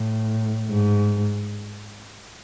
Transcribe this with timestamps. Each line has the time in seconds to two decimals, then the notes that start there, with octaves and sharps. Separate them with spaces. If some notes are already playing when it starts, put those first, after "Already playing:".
Already playing: A2
0.70 G#2